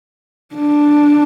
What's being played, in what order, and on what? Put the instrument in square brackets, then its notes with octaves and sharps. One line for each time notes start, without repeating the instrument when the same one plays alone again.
[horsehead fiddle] D4